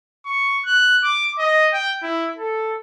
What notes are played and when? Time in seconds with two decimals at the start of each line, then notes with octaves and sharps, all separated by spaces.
0.26 C#6
0.66 F#6
1.04 D6
1.38 D#5
1.73 G5
2.03 E4
2.37 A4